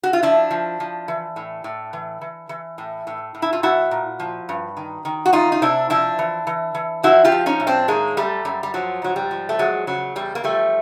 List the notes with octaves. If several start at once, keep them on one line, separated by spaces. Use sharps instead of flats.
F#4
F4
F3 D4 E4
F3
F3
E3
A2
A2
E3
E3
E3
A2
A2
A2
E4
F4
F3 E4 F#4
A#2
F3
G2
D#3
D#3
F#4
E2 D#4 F4
D#4
C3 D4 E4
F3 D4 E4
E3
E3
E3
F3 E4 F#4
F4 G4
F3
C#4 D#4
A2
C4 D4
D#3 G#3 A#3
F#2 G3 A3
F#2 G3
G3
F3 F#3
G#2 F#3
G3
F3
A3
E2 F#3 G#3
C#3 F#3
E2 G3
A#3
F3 G3 A3